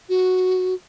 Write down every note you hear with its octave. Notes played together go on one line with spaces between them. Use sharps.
F#4